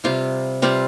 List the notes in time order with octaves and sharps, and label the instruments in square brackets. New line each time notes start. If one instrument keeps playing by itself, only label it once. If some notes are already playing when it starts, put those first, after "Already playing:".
[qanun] C3 G3 C4 F4
C3 G3 C4 F4